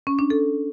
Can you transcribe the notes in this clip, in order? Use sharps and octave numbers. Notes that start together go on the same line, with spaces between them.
C#4
D4
A4